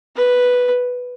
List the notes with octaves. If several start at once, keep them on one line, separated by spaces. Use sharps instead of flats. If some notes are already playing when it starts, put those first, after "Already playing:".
B4